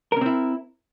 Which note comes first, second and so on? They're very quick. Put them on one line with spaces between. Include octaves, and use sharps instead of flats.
A#4 C#4 C4 E4